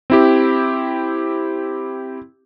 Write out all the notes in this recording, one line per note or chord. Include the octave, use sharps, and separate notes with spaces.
C4 E4 G4